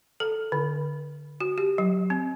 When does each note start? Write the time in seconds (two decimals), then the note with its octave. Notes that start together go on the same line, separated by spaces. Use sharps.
0.20 A4
0.52 D3
1.40 F#4
1.58 G4
1.78 F#3
2.10 C4